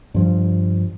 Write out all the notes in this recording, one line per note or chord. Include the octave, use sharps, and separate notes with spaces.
G2 F3 G3